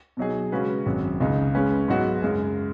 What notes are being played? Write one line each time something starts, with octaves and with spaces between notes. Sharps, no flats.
B2 F#3 D#4 G#4
C#3 G#3 C#4 F#4 B4
G#1 F#2 F#3
C#2 C#3 G#3 D#4
C#3 G#3 C#4 B4
G#2 F#3 B3 D#4 F#4
F#2 C#3 G#3